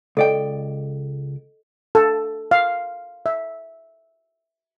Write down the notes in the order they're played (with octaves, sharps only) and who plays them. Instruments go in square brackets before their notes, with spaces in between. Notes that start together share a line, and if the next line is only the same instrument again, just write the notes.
[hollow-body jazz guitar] C#2 D5 G5 [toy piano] A4 D#5
[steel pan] A4
F5
E5